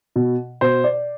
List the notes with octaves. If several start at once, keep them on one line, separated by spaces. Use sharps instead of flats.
B2
B2 C5
D5